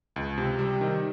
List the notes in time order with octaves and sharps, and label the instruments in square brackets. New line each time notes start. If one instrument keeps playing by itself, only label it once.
[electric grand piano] C#2
C3
G3
D#3